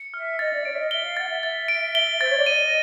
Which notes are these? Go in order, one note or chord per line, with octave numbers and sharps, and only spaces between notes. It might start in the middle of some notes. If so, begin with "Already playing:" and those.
Already playing: C#7
E5 F6
D#5 A6
D5
C#5 D7
E5
D#5
E5 G7
F5
F#5 A6
E5
E5 A6
D7
G7
C5 A6
C#5
D5
D#5 D#7